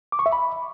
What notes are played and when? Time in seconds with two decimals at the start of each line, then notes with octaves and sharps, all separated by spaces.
0.12 D6
0.19 C#6
0.26 E5
0.32 B5